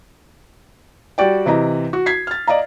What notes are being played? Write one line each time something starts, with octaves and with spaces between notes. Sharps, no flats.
G3 F#4 D5 G5
C3 E3 D#5 A#5
F#4
G#6 B6 C7
F6 A6
D5 D#5 F5 A#5